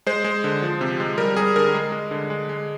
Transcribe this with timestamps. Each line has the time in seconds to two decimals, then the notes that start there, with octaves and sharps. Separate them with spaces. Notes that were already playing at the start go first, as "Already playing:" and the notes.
0.06 G#3 C5
0.24 G#3
0.44 D3
0.62 F3
0.81 C3
1.00 G#3
1.18 G3 A#4
1.36 G3 G#4
1.56 D3 A#4
1.74 G#3
1.92 G#3
2.11 D3
2.30 G#3
2.49 G#3